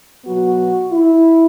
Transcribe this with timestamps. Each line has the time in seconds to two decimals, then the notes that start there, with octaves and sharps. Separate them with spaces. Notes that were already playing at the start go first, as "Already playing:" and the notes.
0.25 B2 F#3 B3 F#4
0.91 E4